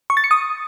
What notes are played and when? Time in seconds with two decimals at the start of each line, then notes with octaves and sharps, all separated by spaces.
0.10 C#6
0.17 A6
0.24 C#7
0.31 D#6